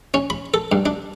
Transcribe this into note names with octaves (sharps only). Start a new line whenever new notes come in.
C#4
B5
A4
G2
D4